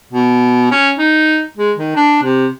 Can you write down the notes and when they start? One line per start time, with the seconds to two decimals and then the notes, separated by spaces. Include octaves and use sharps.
0.13 B2
0.71 C#4
0.98 D#4
1.57 G#3
1.77 D#3
1.96 D4
2.23 C3